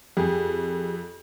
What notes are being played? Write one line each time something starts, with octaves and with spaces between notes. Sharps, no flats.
F2 G4 G#4